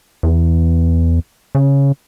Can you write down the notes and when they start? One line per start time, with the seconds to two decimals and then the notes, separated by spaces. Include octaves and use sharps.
0.23 E2
1.55 C#3